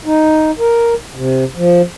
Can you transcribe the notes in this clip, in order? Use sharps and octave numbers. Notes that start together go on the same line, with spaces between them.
D#4
A#4
C3
F3